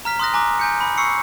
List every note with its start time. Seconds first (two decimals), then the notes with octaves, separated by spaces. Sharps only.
0.05 A#5 F6 B6
0.19 C6 D#6 F#6 A#6
0.34 G#5 A#5 D6 F#6
0.59 G#5 G6 C#7
0.81 B5
0.98 C#6 E6 C7 C#7